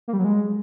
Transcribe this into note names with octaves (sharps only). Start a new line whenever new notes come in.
A#3
G3
F#3
G#3